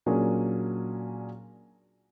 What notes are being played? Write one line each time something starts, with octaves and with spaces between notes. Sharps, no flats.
A#2 F#3 C#4 D4 G#4 A#4